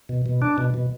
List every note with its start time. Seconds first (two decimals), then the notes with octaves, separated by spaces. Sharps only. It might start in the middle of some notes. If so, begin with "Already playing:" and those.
0.09 B2
0.26 B2
0.42 D4
0.58 B2
0.74 B2